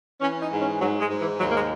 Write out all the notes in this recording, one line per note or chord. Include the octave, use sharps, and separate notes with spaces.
E3 C#4
D#4
G#2
C#4
G#2 F#3
G#3
G#2
E3
D#2 F#3
A#3
G#3